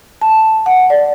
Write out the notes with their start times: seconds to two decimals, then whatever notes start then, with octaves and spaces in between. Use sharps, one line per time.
0.21 A5
0.66 F#5
0.90 D5